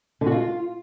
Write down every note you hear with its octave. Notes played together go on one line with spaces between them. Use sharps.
D3
F#4
F4